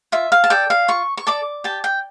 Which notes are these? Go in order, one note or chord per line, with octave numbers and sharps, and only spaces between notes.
F4 E5
F5
A5
A4 D5 G5
F5
F4 C#6
C#6
A4 D5 D6
G4 A5
G5